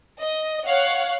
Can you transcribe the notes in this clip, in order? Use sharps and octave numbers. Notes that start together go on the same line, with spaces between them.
D#5
C#5 F5 F#5 F#6